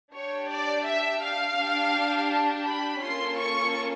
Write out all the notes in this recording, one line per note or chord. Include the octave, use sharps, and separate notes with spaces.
D4 G4 C#5
D5
E5
F5
D4 G4
A5
B5
A#3 C#4 F4 A4 C6
C#6